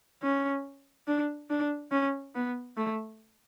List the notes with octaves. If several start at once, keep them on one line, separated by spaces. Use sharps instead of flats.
C#4
D4
D4
C#4
B3
A3